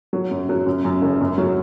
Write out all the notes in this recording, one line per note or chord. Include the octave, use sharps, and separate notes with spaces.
F#3
F#2
F#3
F#2
F#2
F#1
F#2
F#3